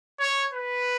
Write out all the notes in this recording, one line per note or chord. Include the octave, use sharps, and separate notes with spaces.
C#5
B4